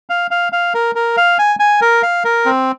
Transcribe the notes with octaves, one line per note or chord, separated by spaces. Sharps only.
F5
F5
F5
A#4
A#4
F5
G#5
G#5
A#4
F5
A#4
C4